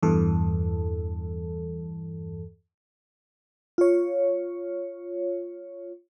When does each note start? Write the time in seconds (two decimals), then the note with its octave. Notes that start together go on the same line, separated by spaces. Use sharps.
0.03 E2 G2 E3 A4
3.78 F4 C#5